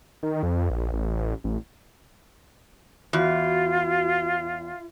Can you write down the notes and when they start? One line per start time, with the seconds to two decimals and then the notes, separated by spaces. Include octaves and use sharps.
0.23 D#3
0.43 F2
0.70 A#1
0.93 A1
1.44 A1
3.13 E2 F4 F#4